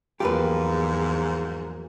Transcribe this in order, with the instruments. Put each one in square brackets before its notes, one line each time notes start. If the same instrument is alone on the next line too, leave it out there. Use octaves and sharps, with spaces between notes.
[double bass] E2 [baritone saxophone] G#2 [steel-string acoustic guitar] F3 F#3 A#3 [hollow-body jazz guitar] G4 B4